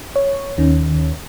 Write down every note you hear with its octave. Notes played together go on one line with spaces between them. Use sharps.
C#5
D#2 D#3 C#4